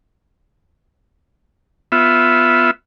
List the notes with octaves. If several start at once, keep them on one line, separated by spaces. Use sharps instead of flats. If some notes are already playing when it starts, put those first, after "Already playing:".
B3 F4 E5